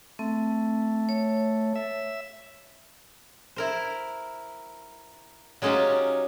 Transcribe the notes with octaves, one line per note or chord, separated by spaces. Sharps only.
A3 C4
C#5
E5
E4 A#4 C5
F#3 G#3 C#4 D#4 F4 G4